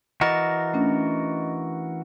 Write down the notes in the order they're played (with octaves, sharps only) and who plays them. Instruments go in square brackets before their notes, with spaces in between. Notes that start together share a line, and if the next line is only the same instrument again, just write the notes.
[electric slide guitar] E3 F#4 A#4 [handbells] D#5 A6
[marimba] A3 C#4 D4